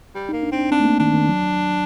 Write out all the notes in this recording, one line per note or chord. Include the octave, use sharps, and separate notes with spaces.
G3
A#3 D#4
D4
C4
D4
C4 D4
A3
A#3
D#3 D4
D#3
F#3